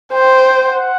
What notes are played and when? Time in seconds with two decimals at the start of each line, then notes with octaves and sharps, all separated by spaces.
0.12 C5 G5
0.66 F#5